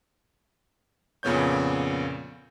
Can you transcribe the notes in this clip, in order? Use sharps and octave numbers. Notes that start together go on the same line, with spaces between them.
F2 A#2 C#3 B3 C#5 G6